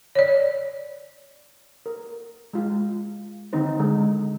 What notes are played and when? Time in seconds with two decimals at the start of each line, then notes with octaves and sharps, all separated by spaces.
0.15 C#5 D5
1.86 A#4
2.53 G#3 F4
3.53 D3 D#3 C4 D#4 C5
3.79 D3 G#3 D4